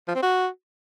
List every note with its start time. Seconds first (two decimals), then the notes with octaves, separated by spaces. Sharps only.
0.08 F3
0.15 C4
0.22 F#4